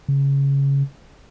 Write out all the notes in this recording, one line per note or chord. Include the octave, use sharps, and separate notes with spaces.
C#3